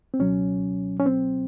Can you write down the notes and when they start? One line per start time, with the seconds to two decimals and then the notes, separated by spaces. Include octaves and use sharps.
0.14 C4
0.19 C#2 B2 F#3 C#4
1.00 C#4
1.06 C4